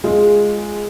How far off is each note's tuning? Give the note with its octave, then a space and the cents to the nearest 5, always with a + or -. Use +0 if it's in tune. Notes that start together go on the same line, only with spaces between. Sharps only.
G#3 +0 F4 +0